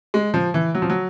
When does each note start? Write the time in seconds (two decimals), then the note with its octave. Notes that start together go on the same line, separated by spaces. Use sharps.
0.14 G#3
0.34 F3
0.54 E3
0.75 F#3
0.82 F3
0.90 F#3